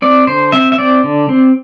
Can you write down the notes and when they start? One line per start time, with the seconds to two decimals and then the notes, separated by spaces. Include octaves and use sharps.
0.02 C4 D5
0.27 D3 C5
0.52 C4 E5
0.72 E5
0.78 C4 D5
1.04 D3
1.29 C4